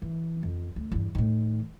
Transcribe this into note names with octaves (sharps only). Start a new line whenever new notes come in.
E3
F2
D2
E2 G2
A2 D#3